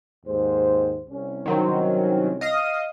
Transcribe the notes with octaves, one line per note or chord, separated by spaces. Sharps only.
D#2 G#2 C5
C2 C#4
D#3 F#3 C4
D#5 F5 D#6